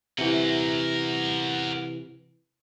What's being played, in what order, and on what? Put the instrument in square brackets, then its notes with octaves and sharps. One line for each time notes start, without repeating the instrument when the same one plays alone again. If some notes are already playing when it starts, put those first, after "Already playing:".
[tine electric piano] C3 E3 [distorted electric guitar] A#4 F#5